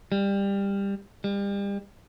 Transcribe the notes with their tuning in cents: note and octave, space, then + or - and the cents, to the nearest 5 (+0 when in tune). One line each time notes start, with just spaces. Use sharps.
G3 +20
G3 +35